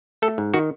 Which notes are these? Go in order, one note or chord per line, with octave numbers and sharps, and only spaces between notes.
A3 A4
G#2
D#3 F#4